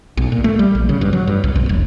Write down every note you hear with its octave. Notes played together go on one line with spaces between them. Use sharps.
B1
A#2
A3
G3
A#1
C#3
G2
F#3
G2
C2
B1
F1